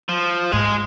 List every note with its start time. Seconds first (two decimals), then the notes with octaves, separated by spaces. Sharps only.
0.09 F3
0.52 G#2 G#3